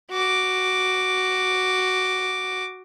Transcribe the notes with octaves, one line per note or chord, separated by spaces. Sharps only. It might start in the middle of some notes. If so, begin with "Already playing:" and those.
F#4 D6